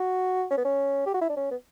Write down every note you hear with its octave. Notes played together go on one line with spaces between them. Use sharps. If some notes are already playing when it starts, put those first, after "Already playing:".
Already playing: F#4
C#4
B3
C#4
G4
F#4
E4
D4
C#4
B3